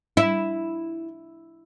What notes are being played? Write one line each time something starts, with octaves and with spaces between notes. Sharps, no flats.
E4